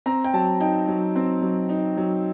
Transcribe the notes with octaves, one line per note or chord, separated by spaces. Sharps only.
C4 A#5
G5
F#3 A5
D#4 G5
F#3
C4
F#3
D#4
F#3